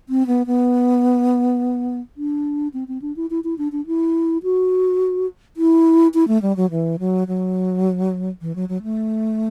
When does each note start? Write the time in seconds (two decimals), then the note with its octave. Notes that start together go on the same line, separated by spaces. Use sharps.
0.09 C4
0.27 B3
0.47 B3
2.17 D4
2.74 C4
2.88 C4
3.02 D4
3.16 E4
3.30 E4
3.44 E4
3.58 D4
3.72 D4
3.87 E4
4.43 F#4
5.57 E4
6.14 E4
6.28 A3
6.42 G3
6.57 F#3
6.71 E3
6.99 F#3
7.28 F#3
8.41 E3
8.56 F#3
8.69 F#3
8.83 A3